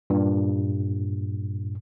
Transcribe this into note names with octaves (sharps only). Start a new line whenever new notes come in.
G2 A#2